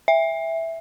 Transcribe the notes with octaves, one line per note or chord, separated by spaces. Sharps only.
E5